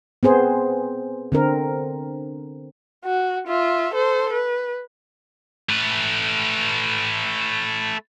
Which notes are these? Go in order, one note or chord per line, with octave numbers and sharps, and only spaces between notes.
B3 C4 G#4 C5
D3 C4 A#4
F#4
F4 E5
A4 C5
B4
A3 B4